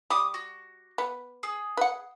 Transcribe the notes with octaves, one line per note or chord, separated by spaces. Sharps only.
G3 D6 D#6
F#4
B3
G#4
B4 F#5